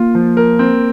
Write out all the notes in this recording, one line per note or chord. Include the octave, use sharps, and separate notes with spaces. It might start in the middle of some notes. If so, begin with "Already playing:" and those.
Already playing: A#3 F4
F3
A#4
C4